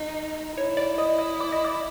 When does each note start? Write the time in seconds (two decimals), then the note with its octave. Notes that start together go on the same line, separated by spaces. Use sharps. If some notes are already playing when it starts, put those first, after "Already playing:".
Already playing: D#4
0.57 E4 C#5
0.77 D5
0.98 D#5
1.18 D#5
1.40 D5
1.52 D#5
1.64 D5